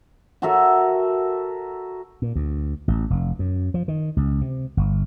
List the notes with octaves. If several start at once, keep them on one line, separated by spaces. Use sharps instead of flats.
F#4 A4 A#4 E5
A#2
D2
A1
F1
F#2
F3
D#3
C#2
C3
G1